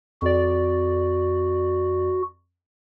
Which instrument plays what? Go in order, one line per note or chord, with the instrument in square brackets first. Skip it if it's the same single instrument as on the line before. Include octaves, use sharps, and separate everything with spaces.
[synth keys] F2 D5 [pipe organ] F#4